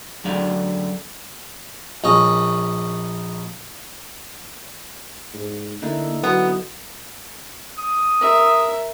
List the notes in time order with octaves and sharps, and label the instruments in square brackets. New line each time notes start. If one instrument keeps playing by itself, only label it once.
[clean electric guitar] F#2 D3 F#3 G#4 D5 F5
[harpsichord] A#1 C#4 D#5
[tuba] G#2
[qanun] D3 D#4 E4 [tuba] A#3
[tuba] F#3 [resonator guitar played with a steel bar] B3
[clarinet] D#6
[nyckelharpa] A#4 E5